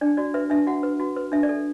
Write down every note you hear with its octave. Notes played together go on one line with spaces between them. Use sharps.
D4 D5
F#4 D5
B4 E5
D4 E5
F#4 F#5
B4
F#4
B4
D4 E5
D5
A4